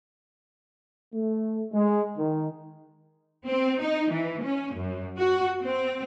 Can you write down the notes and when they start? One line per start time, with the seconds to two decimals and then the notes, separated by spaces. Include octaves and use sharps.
1.13 A3
1.73 G#3
2.18 D#3
3.47 C4
3.81 D#4
4.11 E3
4.44 C#4
4.76 F#2
5.19 F#4
5.63 C4